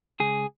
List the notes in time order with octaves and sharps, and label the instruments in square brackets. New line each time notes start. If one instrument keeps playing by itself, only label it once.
[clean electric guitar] C#2 G#4